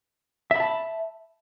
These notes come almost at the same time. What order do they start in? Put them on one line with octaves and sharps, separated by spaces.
E5 B5 A5